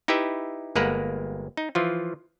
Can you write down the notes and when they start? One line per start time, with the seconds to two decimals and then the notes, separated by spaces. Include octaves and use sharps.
0.08 D#4 E4 G4 B4 E5
0.75 G1 G#3 A#3 A#4 B4 F#5
1.57 D#4
1.75 E3 F3 F4